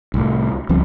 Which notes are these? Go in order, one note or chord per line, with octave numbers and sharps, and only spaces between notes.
C2 A2
C#2 F3 G3 C4